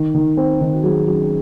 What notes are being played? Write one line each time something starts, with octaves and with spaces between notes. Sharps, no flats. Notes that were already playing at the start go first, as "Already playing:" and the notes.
Already playing: D#3
D#3
C4
D#3
F#4
F#3 G#4
F#3 C#4